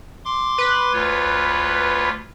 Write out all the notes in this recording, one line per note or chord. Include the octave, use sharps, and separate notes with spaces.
C6 D6
B4
D2 F4 C#5